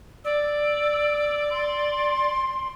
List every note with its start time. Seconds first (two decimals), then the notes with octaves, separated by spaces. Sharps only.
0.25 D5 E6
1.50 C6